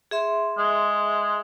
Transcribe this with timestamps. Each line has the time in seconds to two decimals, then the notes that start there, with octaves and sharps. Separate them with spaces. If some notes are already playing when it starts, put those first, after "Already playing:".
0.11 G#4 E5 C6
0.58 G#3